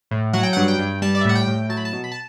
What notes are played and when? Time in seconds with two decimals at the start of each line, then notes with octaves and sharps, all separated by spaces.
0.11 A2
0.33 F#3 F#5
0.43 G5
0.53 G2 F#5
0.68 G5
0.79 G2
1.02 G3 A5
1.15 D5
1.21 E5
1.25 A2 F#5
1.35 G5
1.47 A2
1.69 F#3 A5
1.77 B5
1.85 A5
1.93 B2
2.04 B5
2.12 A5